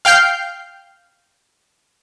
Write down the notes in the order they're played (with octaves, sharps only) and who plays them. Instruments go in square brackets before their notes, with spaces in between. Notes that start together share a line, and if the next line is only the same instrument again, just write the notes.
[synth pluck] F5 G5 F6 G6 C7